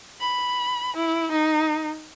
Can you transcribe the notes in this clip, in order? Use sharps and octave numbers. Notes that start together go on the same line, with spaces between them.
B5
E4
D#4